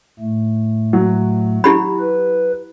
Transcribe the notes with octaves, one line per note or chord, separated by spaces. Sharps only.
A2 A3
F#3
E4 G4 B5
B4